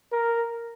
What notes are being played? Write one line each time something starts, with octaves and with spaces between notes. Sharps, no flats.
A#4